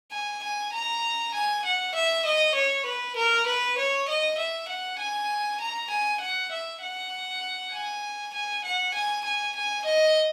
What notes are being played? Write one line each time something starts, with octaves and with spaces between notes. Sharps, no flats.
G#5
G#5
A#5
G#5
F#5
E5
D#5
C#5
B4
A#4
B4
C#5
D#5
E5
F#5
G#5
A#5
G#5
F#5
E5
F#5
G#5
G#5
F#5
G#5
G#5
G#5
D#5